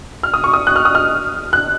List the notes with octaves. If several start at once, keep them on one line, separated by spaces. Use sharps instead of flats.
F6
D#6
C#6
D#6
F#6
F6
D#6
F6
F#6